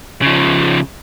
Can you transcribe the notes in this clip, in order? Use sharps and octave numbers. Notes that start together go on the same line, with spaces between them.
C#3 F3